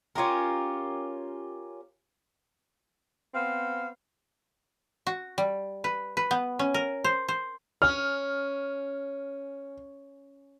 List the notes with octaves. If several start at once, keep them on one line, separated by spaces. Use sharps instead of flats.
C#4 F4 G4 A#4
B3 C4 C5 F5
F#4
G3
B4
B4
B3
C#4
A#4
C5
C5
C#4 F6